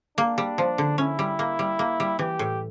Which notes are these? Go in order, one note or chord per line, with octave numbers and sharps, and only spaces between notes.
A#3 D4
G3
F3
D3
C#4 E4
G3
A#3
G3
A#3
G3
E3 G4
A2